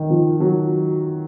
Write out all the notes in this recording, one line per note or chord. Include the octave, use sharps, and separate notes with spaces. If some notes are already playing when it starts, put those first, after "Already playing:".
Already playing: D#3
F3
F#3